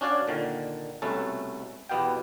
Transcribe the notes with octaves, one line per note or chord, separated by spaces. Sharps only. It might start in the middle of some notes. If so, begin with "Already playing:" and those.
C#4 D4 F#4 C#5 D5 F5
A#2 D3 D#3
C2 B2 A3 C#4 A4
E2 B2 B3 G4 F5 G5